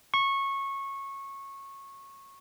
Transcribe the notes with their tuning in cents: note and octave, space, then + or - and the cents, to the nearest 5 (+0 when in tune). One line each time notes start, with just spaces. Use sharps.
C#6 -20